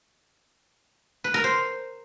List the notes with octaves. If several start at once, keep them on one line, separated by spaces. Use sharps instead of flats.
B4
A#4
C5